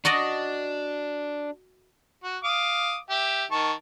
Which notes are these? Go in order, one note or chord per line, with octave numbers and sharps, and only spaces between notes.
D4 F#4 D5 D#5
F#4
F5 D6 D#6
G4 E5
D#3 A5 C#6